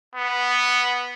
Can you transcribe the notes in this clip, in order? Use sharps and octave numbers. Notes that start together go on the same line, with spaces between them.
B3